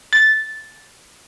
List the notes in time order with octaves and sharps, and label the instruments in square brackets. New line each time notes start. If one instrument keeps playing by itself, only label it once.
[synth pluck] A6